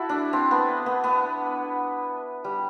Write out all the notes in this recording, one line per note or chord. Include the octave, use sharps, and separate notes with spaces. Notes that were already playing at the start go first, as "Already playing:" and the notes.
Already playing: E4 F#4 A4
D4
C4
B3
B3
B3
G3